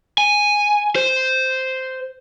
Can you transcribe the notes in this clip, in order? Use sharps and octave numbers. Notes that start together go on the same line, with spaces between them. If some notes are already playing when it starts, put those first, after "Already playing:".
G#5
C5